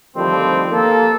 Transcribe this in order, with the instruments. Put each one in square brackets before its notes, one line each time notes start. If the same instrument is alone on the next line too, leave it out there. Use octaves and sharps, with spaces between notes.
[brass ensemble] D3 D#3 F3 G3 A3 C4
A#3 A4